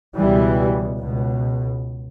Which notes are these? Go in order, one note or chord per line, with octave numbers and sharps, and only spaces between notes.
C#2 B2 E3 G3
C#2 B2